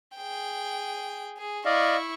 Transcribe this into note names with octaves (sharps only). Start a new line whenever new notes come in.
G#4 G5
G#4
E4 D5 D#5 F5 C#6